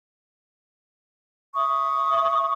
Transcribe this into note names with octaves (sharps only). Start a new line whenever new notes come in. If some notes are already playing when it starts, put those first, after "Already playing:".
E5 C#6 D#6